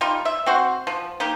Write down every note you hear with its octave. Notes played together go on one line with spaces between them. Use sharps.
G3 D#4 F4
E5
C4 F#4 C5
F3
A#3 D#4 G4